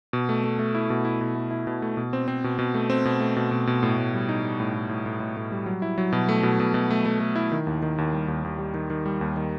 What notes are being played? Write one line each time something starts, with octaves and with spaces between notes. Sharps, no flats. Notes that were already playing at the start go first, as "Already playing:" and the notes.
B2
A3
A3
A3
E4
B2
E4
B2
A3
E4
B2
A3
B2
C4
C4
B2
B2
A3
C4
B2
A3
B2
B2
B2
A2
A2
G3
D#4
G3
A2
A2
A2
A2
A2
A2
G3
F#3
E4
F#3
B2
A3
B2
B2
B2
A3
A3
A3
E4
D#3
D#2
D#3
D#2
G3
D#2
D#2
G3
D#3
D#3
G3
D#2
D#3